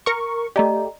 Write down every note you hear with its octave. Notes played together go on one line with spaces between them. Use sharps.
A#4 C#6
A3 G4 D5 D#5 A#5